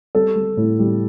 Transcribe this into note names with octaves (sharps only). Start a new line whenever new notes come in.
G3 A4
G3
A2
G3